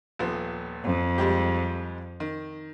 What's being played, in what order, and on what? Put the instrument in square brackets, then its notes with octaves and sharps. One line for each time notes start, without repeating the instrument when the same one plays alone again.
[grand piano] D#1 F3 B3
[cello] F2
[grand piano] G3 G#3 G4
D#3